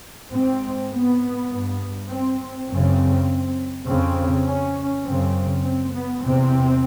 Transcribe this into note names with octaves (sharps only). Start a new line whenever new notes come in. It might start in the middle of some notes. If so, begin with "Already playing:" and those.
G#2 C4
B3
G2
C4
F#2 C#3 C4
F2 C#3 C4
C#4
F#2 C#3 C4
C4
B3
E2 C3 C4